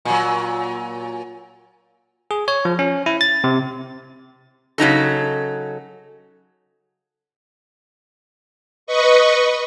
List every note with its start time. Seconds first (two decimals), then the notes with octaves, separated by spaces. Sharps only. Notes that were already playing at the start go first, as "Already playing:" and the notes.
0.05 A#2 F#3
2.31 G#4
2.48 C#5
2.65 F3
2.79 C#4
3.06 E4
3.21 A6
3.44 C3
4.78 C#3 F#3 D#4 A4
8.87 B4 D#5 C#6